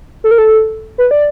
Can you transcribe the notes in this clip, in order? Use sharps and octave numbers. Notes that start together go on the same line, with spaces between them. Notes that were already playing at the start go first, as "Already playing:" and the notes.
A4
A#4
A4
B4
D5